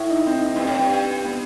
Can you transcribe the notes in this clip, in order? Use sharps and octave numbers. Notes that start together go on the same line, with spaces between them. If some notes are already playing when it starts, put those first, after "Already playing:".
Already playing: A2 E4
D#4
C4
D#4
D#4
G2 C4
A2
G2
B3